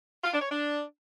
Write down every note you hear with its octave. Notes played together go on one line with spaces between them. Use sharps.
F4
D4
C#5
D4